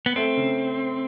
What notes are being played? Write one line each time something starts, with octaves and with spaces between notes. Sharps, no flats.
B3
A3 C4
C#3